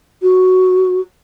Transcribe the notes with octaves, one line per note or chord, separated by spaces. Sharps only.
F#4